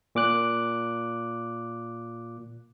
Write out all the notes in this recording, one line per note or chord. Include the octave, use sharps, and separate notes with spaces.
A#2 D6 F#6